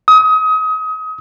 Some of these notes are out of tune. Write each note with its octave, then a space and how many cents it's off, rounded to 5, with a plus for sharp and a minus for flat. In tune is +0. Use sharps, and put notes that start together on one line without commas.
D#6 +30